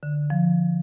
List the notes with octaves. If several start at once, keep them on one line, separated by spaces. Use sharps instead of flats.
D3
F3